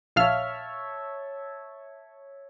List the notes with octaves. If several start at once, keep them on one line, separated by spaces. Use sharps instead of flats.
A#1 C#5 E5 F5 A5 F6